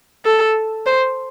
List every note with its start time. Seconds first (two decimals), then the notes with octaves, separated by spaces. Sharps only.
0.25 A4
0.86 C5